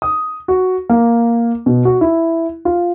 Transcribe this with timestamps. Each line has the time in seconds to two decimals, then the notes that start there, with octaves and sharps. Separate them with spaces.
0.02 D#6
0.48 F#4
0.90 A#3
1.66 B2
1.85 F#4
2.01 E4
2.65 F4